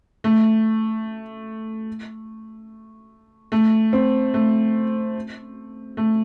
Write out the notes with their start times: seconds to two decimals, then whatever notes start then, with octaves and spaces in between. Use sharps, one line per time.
0.24 A3
3.52 A3
3.93 C4
4.34 A3
5.97 A3